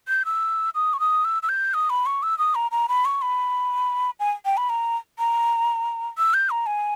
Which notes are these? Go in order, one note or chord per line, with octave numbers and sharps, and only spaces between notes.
G6
E6
D#6
C#6
D#6
E6
E6
G6
D#6
B5
C#6
E6
D#6
A#5
A#5
B5
C#6
B5
G#5
G5
B5
A#5
A#5
E6
G6
A#5
G#5